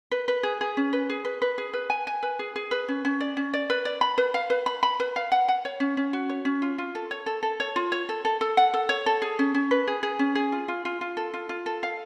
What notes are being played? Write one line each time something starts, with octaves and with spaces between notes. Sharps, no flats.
B4
B4
G#4
G#4
C#4
B4
G#4
B4
B4
G#4
B4
G#5
G#5
B4
G#4
G#4
B4
C#4
C#4
D5
C#4
D5
B4
D5
B5
B4
F5
B4
B5
B5
B4
F5
F#5
F#5
C#5
C#4
C#4
F#4
C#5
C#4
F4
F4
A4
C#5
A4
A4
C#5
F4
C#5
A4
A4
A4
F#5
A4
C#5
A4
G#4
C#4
C#4
B4
G#4
G#4
C#4
G#4
F4
F4
F4
F4
A4
F4
F4
A4
F5